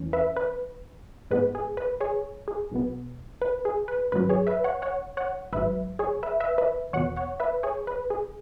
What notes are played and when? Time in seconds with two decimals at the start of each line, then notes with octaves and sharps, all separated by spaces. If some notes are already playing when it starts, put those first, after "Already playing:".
Already playing: E2 E3 C#4
0.13 B4 E5
0.36 B4
1.31 G#2 G#3 B3 B4
1.55 G#4
1.77 B4
2.01 G#4 C#5
2.48 G#4
2.72 B1 B2 B3
3.42 B4
3.65 G#4
3.88 B4
4.12 G#1 F#2 F#3 B4
4.30 G#4 C#5
4.47 B4 E5
4.64 C#5 F#5
4.82 C#5 F#5
5.17 C#5 F#5
5.53 G#1 G#2 F#3 B4 E5
5.99 G#4 C#5
6.23 B4 E5
6.40 B4 E5
6.58 B4 E5
6.93 E2 B2 B3 C#5 F#5
7.16 C#5 F#5
7.40 B4 E5
7.63 G#4 C#5
7.87 B4
8.10 G#4